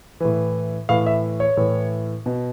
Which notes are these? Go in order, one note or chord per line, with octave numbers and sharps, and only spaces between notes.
A2 E3
A2 E3 F5
E5
C#5
A2 E3
B2